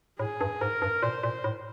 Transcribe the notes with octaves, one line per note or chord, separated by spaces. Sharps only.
A2 G#4
G2
G#2 A#4
G2
A#2 C5
A#2
A2